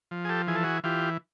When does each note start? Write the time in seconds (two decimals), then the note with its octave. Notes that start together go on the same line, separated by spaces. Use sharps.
0.11 F3
0.25 G#4
0.29 G4 A4
0.47 E3 G#4
0.55 A4
0.63 F#4 G#4
0.84 E3 F4 G4